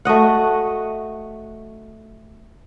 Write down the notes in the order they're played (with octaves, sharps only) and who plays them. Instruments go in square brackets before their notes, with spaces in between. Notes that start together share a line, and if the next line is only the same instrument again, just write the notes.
[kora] A3 F#4 D#5 F#5